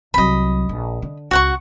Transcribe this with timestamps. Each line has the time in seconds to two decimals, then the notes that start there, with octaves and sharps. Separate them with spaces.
0.14 C2 F#3 D#5 B5
0.69 A#1
1.02 D3
1.31 C#2 F#4 F#5 C#6